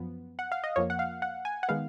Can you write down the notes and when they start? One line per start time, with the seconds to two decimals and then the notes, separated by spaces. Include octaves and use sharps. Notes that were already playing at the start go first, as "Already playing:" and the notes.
Already playing: F#2 F3 B3
0.39 F#5
0.52 F5
0.64 D#5
0.76 F2 F3 A#3 C#5
0.90 F#5
0.99 F5
1.22 F#5
1.45 G#5
1.63 F#5
1.68 D#3 G#3 B3 F5